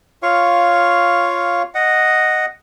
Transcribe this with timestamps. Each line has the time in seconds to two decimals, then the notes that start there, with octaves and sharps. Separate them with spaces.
0.23 F4 C#5 F5 C#6
1.75 D#5 F#5